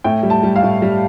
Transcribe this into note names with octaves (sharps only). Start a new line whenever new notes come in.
A2 G5
G3
A5
G3
F5
A2
G3